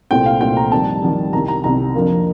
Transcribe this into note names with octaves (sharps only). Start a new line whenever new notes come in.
C2 A#2 A3 C4 G5
F5
C2 A#2 A3 C4 G5
A#5
F2 D#3 G3 A5
F2 D#3 G3
C2 C3 D#3 A#5
A#5
C2 C3 D#3 A#5
F2 D3 F3 A#3